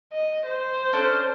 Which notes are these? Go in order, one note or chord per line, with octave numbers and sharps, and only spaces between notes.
D#5
C5
C#4 D4 A4